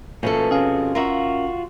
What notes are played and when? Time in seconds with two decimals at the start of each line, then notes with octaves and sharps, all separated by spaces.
0.23 B2 F3 A3 A#3 C#4 A4
0.51 C3 C#4 G#4 F5
0.95 F4 F#4 A#4 E5